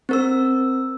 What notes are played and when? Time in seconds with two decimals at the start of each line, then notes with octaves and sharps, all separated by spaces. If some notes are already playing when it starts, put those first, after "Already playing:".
0.09 C4 A#4 E6